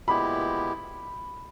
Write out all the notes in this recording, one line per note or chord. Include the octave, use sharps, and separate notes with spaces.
A#2 G#3 B3 E4 G4 B5